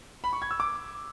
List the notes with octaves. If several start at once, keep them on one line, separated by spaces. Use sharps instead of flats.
B5
C#6
G#6
E6
D6